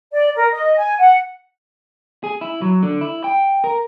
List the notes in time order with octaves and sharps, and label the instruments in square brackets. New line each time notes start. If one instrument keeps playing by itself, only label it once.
[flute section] D5
A#4
D#5
G#5
F#5
[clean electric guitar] G#4
E4
F#3
D3
E4
G5
A#4